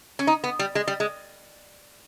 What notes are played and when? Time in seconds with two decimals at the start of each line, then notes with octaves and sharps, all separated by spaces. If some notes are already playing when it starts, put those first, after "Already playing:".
0.19 C#4
0.27 D#4
0.44 B3
0.59 G3
0.75 G#3
0.88 G3
1.00 G#3